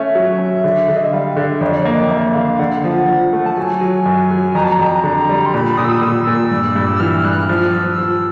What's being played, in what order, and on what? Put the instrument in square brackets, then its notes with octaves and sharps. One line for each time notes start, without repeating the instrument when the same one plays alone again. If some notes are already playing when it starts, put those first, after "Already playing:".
Already playing: [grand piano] A3 C#4 [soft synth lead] E5
[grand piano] F#3
C#4
D3
D3
[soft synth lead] D#5
E5
[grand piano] G3 [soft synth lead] F5
[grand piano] D3 [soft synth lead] E5
[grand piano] F2 [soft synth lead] C#5
[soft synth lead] D5
C#5
[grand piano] A#3 [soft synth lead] D#5
[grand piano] A#3 [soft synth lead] E5
[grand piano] D3 [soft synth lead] F5
[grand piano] D3 [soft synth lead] F#5
[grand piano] F3
F3
A3
[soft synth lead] A5
[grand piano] F#3 [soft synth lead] G#5
[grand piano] F#3
F#2
F#3
[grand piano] F2 [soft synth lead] A#5
[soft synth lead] A5
A#5
[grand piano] F2
D3
G3
[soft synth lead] C6
[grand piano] A#2 [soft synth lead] B5
[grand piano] A#2 [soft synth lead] D#6
[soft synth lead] E6
D#6
[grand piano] A#2 [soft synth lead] E6
[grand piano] A#2
G2
G2
[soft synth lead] E6
[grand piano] E3 [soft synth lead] F6
[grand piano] G2 [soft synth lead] F#6
[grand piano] F3 [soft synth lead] F6
[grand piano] F3 [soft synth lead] E6
[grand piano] F3